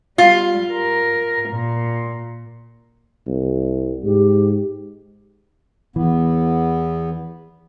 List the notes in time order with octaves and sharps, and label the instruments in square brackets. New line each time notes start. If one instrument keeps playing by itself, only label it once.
[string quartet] G3 [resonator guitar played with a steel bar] F4
[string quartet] A#4
A#2
[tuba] C2
[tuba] G#2 [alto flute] G4
[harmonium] E2 B3 [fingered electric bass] E3